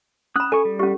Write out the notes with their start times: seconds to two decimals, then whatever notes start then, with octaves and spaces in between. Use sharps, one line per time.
0.36 C#4 B5 D#6 F#6
0.52 A4 G#5 C#6
0.65 G3
0.79 C#4 G4